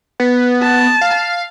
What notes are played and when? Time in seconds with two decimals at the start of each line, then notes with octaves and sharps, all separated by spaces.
0.20 B3
0.62 A5
1.01 F5